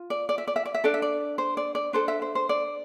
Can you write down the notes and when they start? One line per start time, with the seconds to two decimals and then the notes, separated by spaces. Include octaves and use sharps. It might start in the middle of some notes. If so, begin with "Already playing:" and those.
Already playing: F4
0.10 D5
0.29 D5
0.38 E5
0.48 D5
0.56 E5
0.65 D5
0.74 E5
0.84 D4 A4 D5
0.94 E5
1.02 D5
1.38 C5
1.57 D5
1.75 D5
1.93 D4 A4 C5
2.08 E5
2.22 C5
2.35 C5
2.49 D5